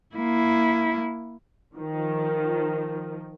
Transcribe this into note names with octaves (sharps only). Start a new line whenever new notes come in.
A#3 E4
D#3 F3